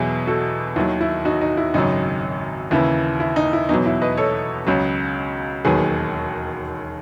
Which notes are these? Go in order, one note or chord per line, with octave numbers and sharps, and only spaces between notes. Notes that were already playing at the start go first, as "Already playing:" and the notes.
Already playing: E2 B2 F#3 E4 G#4
F#4 A4
D#2 D#3 F#3 E4
E4
D#4 F#4
D#4
E4
G#1 F#2 C#3 F#3 D#4
D#2 C#3 E3 E4
E4
D#4
E4
E2 B2 F#3 D#4
E4
B4 D#5
A4 C#5
C#2 C#3 F#3
E1 D#2 D#3 F#3 G#4 B4